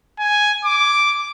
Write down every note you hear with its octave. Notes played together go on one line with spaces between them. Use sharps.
G#5
D6